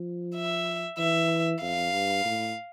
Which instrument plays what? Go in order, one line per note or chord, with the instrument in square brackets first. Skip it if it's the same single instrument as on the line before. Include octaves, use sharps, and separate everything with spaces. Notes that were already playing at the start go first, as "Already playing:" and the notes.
Already playing: [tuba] F3
[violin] E5
[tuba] E3 [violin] E5
[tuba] F2 [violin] F5
[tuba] G2
A2